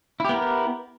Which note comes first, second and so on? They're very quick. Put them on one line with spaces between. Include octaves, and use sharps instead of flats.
E4 G4 B3 A#4